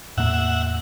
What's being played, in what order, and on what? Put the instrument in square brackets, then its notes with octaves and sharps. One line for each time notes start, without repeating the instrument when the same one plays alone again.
[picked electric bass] E2 A2 A#3 [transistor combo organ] E5 F#5